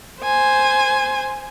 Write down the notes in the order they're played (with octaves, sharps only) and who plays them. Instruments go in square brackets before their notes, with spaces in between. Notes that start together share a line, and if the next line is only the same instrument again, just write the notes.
[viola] C5 G#5